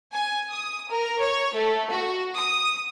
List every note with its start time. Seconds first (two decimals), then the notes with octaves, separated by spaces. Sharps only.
0.12 G#5
0.51 D#6
0.91 A#4
1.21 C#5
1.54 A3
1.91 F#4
2.34 D#6